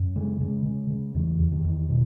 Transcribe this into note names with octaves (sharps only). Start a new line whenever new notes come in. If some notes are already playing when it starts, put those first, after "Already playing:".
Already playing: F#2
C#3 G#3
C#3 G#3
C#3
C#3
E2 E3
E2
D#3
E2
B2